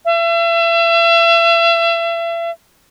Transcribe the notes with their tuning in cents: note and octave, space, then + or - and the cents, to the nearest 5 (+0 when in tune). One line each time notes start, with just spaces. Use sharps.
E5 +35